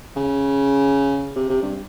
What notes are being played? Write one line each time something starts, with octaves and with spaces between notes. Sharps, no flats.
C#3
C3
C3
G2